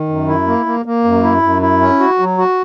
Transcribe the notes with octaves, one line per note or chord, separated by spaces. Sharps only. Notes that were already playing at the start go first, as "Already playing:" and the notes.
Already playing: D#3
F#2
E4
A#3
A#3
A#3
F#2
E4
F#2
E4
C#4
F#4
F#3
F#4